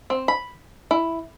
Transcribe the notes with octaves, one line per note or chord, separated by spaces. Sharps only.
C4
B5
E4